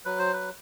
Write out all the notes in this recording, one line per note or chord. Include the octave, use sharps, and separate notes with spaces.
F#3 B4
C5
B4